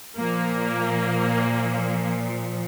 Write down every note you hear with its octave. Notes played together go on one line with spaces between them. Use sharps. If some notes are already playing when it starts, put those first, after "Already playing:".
A#2 F3 A#3